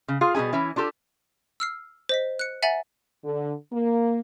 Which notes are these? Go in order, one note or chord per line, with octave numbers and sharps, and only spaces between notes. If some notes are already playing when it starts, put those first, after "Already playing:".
C#3
F4 G#4 F5
B2 G3 E4 G#4 G#5
E3 C#4 E4
D4 F4 G4 A4
E6 F6 C7
C5 D#5 B6
F#6 C#7
E5 F#5 G#5 A#5 A6 F#7
D3
A#3